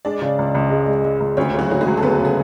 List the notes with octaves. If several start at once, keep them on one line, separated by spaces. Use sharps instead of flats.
G#3 D4 D5
C#3
C#2
C#2
G#3
G#3
G#3
C#2
D2 C#4 C#5
C#3 G#4
F#3 F#4
D2 F#4
G#3 G#4
F#3
A4
D2 B3 B4
C#3
G#4